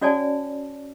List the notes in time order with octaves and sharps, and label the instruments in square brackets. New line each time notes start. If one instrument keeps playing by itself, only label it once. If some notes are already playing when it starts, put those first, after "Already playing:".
[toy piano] C#4 F#4 C#5 D5 G#5 A5